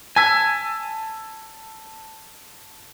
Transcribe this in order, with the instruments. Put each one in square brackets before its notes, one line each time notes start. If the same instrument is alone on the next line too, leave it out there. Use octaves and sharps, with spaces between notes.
[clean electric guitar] G#5 [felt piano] A5 E6 B6